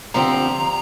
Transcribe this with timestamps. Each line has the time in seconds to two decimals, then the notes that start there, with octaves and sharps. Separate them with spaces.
0.14 D3 F3 C4 G4 A#5